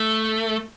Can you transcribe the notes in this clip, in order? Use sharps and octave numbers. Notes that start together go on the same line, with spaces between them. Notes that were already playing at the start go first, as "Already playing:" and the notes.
Already playing: A3